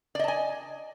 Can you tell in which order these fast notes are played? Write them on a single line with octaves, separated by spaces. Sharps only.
D5 D#5 A5 G#5